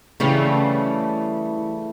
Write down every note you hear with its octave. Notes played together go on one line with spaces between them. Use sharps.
C#3 E3 G3 A3 C#4